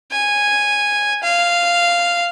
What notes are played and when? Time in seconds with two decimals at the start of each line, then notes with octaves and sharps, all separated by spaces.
0.12 G#5
1.23 F5